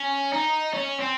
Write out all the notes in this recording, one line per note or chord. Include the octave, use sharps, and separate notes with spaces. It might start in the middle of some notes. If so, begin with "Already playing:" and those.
Already playing: C#4
D#4
C#4
C4